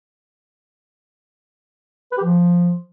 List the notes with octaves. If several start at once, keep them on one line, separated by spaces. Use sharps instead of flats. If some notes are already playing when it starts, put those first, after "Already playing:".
B4
G4
F3